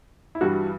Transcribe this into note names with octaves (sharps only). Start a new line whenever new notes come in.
E4
G2 E3 G3 F#4